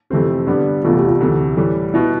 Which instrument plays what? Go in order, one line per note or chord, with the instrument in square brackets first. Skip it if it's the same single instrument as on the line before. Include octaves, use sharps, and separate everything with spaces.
[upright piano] F2 C3 E3 A3 C4 [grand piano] G4
[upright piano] G2 D3 G3 B3
[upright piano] F1 E2 B2 A3 [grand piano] F4
[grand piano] G4
F4
G4
[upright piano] D2 C3 E3 A3
A2 E3 G3
[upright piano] B2 B3 [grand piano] E4